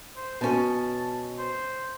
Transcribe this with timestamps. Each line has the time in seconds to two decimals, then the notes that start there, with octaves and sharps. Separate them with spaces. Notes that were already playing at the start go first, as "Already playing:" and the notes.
0.16 C5
0.41 B2 C#4 A5
1.39 C5